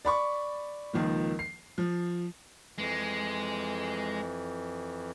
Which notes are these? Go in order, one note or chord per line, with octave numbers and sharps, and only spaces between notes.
D5 B5 C#6
C#2 D#3 F3 A#3
C7
F3
F2 E3 G#3